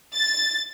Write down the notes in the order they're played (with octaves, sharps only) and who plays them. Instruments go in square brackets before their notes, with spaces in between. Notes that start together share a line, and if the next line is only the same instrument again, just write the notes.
[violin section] A6